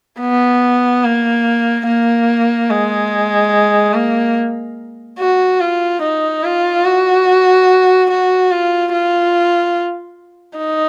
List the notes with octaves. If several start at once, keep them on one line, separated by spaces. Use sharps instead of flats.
B3
A#3
A#3
G#3
A#3
F#4
F4
D#4
F4
F#4
F#4
F4
F4
D#4